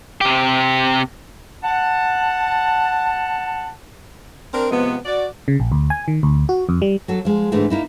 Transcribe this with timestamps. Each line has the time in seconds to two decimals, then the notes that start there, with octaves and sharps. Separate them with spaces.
0.21 C3 G4
1.63 F#5 A5
4.54 C4 D4 A#4
4.70 C3 F3 G#3 B3
5.05 F#4 D5
5.48 C#3
5.60 A#1
5.72 D2
5.90 G#5
6.08 D#3
6.23 D2
6.49 F#4
6.69 F2
6.82 G3
7.08 F#3 F#4 A4
7.25 F3 G#3
7.52 G#2 D3 E3 G#3 A3
7.70 A#3 D#4 E4